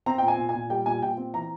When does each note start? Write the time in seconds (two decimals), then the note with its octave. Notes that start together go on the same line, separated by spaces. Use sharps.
0.06 C4 A#5
0.18 A#2 G5
0.28 G#5
0.38 A#2
0.49 G#5
0.54 A#2
0.70 G3 G5
0.86 A#2 G#5
1.02 A#2 G5
1.18 C4
1.34 E3 A#5